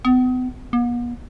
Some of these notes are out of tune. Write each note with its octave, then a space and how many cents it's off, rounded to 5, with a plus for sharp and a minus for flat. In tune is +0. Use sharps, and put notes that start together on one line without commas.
B3 +40
B3 -45